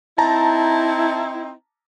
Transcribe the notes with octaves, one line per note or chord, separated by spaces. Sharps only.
C4 D#4 E4 A5 A#5